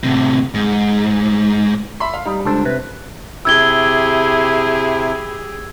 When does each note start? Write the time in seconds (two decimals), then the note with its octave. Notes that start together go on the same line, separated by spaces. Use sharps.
0.04 A2 C3
0.54 G#2
2.00 E5 B5 C6
2.14 F5
2.26 G3 D#4
2.46 C#2 D4 A4 C5
2.65 C3 B4
3.45 C3 E4 G4 G#4 E6 G#6 G7